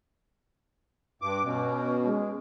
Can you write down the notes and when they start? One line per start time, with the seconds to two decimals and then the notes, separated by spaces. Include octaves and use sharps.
1.22 G2 B4 D6
1.44 B2 C#4
2.04 G#3